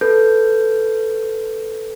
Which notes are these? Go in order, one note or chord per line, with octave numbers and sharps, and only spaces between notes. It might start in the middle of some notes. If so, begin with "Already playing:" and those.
A4 B4 G6